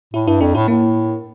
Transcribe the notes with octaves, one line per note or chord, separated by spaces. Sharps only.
A2 E4
G2 E4
F2 D4
A2 E4
A2 A#3